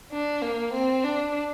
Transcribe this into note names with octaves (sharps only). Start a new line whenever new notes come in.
D4
A#3
C4
D4